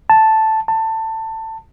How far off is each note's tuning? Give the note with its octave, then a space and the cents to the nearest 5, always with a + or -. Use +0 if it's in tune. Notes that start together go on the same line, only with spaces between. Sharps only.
A5 +0
A5 +20